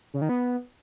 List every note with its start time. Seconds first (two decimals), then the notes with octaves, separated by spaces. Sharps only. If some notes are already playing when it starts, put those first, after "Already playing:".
0.14 C#3
0.22 D#3
0.29 B3